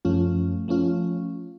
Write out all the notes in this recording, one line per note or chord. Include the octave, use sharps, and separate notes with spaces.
F#2 F3 A3 C#4 F4
F3 A3 C#4 F4